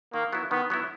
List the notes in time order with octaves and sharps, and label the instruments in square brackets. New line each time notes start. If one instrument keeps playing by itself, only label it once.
[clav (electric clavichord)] D#3 [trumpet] A#3
[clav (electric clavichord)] F#3 B3 E4
[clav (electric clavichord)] D#3 [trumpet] B3
[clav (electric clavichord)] F#3 B3 E4